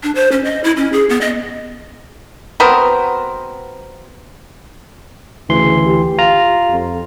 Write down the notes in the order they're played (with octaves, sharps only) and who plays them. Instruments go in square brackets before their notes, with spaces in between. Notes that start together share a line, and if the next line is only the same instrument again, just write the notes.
[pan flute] D4
C5
C#4
D#5
E4
C#4
G#4
B3
D#5
[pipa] B3 C4 F#4 A#4
[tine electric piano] D2 E3 C6 [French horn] C#3
[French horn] G4
[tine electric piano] F4 A#5
[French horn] F2